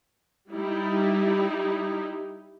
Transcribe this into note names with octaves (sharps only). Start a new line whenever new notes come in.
G3 D#4 E4